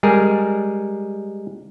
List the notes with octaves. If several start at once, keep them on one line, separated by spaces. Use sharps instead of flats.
G3 G#3 G#4 A#4